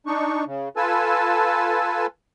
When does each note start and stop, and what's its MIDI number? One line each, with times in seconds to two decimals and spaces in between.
0.07 0.44 62
0.07 0.44 63
0.07 0.44 85
0.46 0.69 49
0.77 2.06 65
0.77 2.06 69
0.77 2.06 71
0.77 2.06 80
0.77 2.06 81
0.77 2.06 88